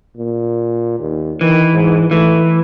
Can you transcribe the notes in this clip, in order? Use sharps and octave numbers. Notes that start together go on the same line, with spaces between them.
A#2
D#2
D#3 E3
G#2
E3 A3